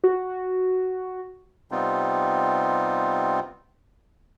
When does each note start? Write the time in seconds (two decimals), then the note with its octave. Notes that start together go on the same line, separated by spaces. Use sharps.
0.04 F#4
1.71 C3 G3 B3 C4 D#4 F4